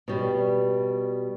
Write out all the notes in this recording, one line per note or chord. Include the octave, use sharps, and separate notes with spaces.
B2 G3